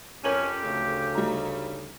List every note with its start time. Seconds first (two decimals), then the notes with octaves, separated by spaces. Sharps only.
0.24 F2 C#4 G4 A#4 F#7
0.64 D2 C#3 A3
1.15 G3 D#4 A#5